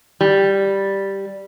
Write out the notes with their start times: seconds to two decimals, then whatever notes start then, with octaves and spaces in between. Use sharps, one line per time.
0.21 G3